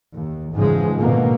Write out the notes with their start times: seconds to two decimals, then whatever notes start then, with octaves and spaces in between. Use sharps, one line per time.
0.15 D#2
0.55 G#2 C#3 E3 F3 G#3
0.98 B2 D3 D#3 A#3